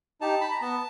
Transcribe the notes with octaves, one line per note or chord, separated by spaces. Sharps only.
D#4 G4 A5
B5
A#5
B3 A5